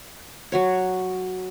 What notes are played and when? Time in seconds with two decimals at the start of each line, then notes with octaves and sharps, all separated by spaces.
0.52 F#3 F#4 C#5